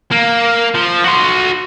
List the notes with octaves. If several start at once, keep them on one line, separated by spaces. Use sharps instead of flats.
A#3
F3
F#4 C6